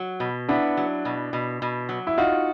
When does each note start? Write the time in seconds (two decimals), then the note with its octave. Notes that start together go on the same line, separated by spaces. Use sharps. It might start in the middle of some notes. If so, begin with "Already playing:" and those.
Already playing: F#3
0.20 B2
0.49 B3 D4 E4
0.77 F#3
1.05 B2
1.33 B2
1.62 B2
1.89 F#3
2.07 E4
2.18 D#4 F4 F#4